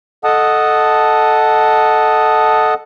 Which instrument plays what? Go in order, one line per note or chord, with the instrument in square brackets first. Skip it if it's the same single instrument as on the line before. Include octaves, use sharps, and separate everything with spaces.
[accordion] A4 D#5 F#5 A5 D#6